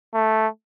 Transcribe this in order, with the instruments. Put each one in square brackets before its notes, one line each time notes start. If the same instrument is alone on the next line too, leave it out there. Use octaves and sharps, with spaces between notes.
[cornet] A3